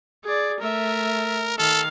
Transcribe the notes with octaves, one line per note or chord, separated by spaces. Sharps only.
G#4 D5
A3 A#4 E5
D#3 A4 F5